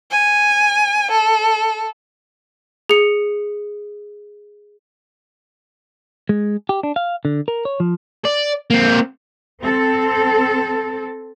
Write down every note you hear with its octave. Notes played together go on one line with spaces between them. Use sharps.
G#5
A4
G#4 C#7
G#3
G4
D4
F5
D3
A#4
C#5
F3
D5
A#3 C4
C4 A4